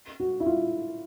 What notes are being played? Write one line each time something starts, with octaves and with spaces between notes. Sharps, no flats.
F#4
E4
F4